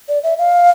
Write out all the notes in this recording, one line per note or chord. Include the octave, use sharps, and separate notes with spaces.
D5
E5
F5